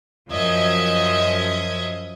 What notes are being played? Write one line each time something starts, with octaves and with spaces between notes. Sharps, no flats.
F#2 F3 D#5 E5 G#6